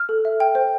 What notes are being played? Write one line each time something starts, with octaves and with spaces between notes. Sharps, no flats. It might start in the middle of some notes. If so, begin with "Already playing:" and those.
Already playing: F6
A4
E5
G5
C5